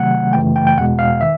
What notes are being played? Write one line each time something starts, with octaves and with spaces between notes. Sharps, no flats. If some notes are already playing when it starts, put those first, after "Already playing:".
Already playing: C3 D#3 F#3 A3 F#5
F#2 C#3 E3 A3 G5
G5
G5
E2 B2 G#3 F#5
F5
D#3 E5